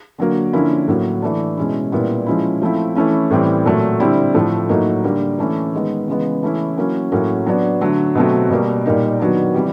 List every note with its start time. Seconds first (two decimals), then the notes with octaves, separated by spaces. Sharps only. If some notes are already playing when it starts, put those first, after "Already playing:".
0.18 D3 F#3 A#3
0.53 D3 F3 A#3 C#4 E4
0.88 A2 F#3 A#3
1.22 E3 A3 D4
1.57 B2 G#3 C#4 E4
1.92 A#2 G3 B3 E4
2.26 F3 G#3 C#4 E4
2.62 F3 A3 C4 E4
2.95 E3 A3 C#4 E4
3.31 A2 E3 G3 C4
3.65 A#2 F#3 A3
4.00 D3 G3 C4 E4
4.34 A2 F3 A3
4.69 A2 F#3 A#3 D#4
5.04 D3 G3 A#3
5.39 E3 A3 C#4
5.73 D#3 G#3 B3
6.08 C#3 E3 G#3 B3
6.43 E3 A3 C#4 E4
6.77 F#3 A#3 C#4 E4
7.12 A2 F#3 A#3 C#4
7.46 F#3 B3 D4
7.81 D3 F#3 A3
8.15 B2 F#3 A3 C4
8.50 B2 G3 A#3
8.86 A#2 G3 A#3 D#4
9.20 D#3 F#3 B3 D4
9.54 C3 E3 G3